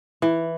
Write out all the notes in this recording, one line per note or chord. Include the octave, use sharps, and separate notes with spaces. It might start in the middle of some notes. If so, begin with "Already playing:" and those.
E3